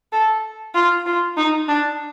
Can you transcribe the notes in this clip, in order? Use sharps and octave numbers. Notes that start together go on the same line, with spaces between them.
A4
F4
F4
D#4
D4